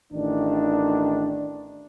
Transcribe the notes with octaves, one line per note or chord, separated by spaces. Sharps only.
A1 D#3 D4